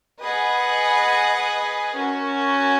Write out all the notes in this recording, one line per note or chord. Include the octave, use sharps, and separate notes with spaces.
G#4 B4 D#5 F#5
C#4 F#4 A#4